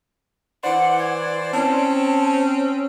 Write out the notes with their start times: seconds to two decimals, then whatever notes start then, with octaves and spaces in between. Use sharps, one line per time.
0.64 E3 C5 D5 F#5
0.99 G#6
1.53 C4 C#4 A5